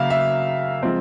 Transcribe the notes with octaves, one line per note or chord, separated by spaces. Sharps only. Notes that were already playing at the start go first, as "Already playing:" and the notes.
Already playing: C#3 F#3 A#3 E5 F5
E5
F3 G#3 C4